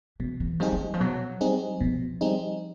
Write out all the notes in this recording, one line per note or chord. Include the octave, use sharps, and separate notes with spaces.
B2 E3
E3
F3 G3 C4 D#4 G#4
F3
E3
F3
B2 F#3
G3 C4 D#4 G#4
B2 F3
G3 C4 D#4 G#4